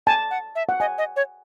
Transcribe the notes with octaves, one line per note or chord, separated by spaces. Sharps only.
G#5 A5
F#5
E5
F#5
D#5 G#5
D#5
C#5